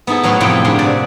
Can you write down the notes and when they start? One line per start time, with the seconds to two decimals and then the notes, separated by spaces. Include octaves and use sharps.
0.07 B3 D#4 E4 G#4 A4
0.23 A2 F#3 B4 C#5 C6
0.40 F2 A2 C3 A#3 B3 G5
0.64 G2 D3 D#4 G4 G#4 C6
0.79 C3 D5 F#5